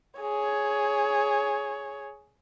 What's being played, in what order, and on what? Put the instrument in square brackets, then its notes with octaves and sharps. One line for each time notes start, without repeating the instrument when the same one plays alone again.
[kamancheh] G#4 C#5